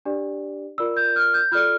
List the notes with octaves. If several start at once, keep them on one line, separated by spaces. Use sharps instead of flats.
D4 G4 D5
F4 A#4 D5 E6
G6
F6
G6
F4 A4 D5 F6